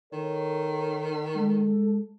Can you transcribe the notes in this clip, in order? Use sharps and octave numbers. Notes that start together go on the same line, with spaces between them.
D#3 A4 C#5
G#3 A4